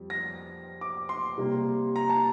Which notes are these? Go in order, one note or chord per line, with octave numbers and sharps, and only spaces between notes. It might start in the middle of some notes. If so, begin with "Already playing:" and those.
Already playing: F2 G3
A#6
D6
C6
C3 G3 A#3
A#5
A5